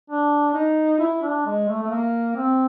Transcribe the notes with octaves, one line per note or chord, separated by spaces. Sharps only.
D4
D#4
E4
D4
G#3
A3
A3
A#3
C4